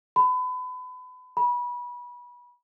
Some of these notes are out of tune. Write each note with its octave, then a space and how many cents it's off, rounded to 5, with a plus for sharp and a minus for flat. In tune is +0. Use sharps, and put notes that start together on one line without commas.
B5 +30
B5 -25